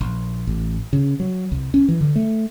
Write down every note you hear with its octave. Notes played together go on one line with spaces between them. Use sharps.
A#1
A1
C#3
F#3
C2
C#4
E3
D3
A3